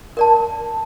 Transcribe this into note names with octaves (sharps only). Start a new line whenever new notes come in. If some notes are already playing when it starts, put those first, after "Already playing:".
A#4 D5 A5